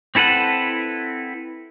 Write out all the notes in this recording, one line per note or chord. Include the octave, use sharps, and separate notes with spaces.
C4 E4 A4 B4 F#5